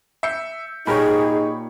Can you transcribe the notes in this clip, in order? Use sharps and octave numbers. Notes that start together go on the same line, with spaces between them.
E5 G6 C#7
A#2 D#4 G4 G#4 A#4 C#5 B5